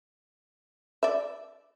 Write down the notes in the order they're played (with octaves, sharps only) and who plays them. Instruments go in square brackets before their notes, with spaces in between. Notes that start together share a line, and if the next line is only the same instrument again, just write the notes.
[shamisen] D5 E5